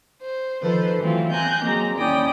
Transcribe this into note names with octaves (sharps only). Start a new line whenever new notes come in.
C5
D#3 F3 A4 B4 C5
E3 F#3 A3 C4 E4 F4
C4 G#5 A#5 F#6 G6
F#3 G#3 A#3 C4 A#5
D#2 C#4 E4 D5 G5 D#6